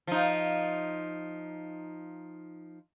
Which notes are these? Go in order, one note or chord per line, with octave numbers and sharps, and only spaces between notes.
F3 D#4